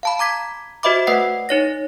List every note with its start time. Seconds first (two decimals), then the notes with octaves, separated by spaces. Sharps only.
0.03 F5 A5 B5
0.19 A#5 D6 G#6 B6
0.83 F#4 C5 D#5 E5 B5 D6
1.07 A3 B4 D#5 F#5 C7
1.49 D#4 C#5 A#6